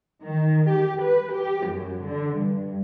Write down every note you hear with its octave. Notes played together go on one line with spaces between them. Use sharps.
D#3
G4
B4
G4
F#2
D3
G2